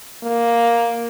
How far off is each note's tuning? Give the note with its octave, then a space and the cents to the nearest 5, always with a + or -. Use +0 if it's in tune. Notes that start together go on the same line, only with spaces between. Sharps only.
A#3 +5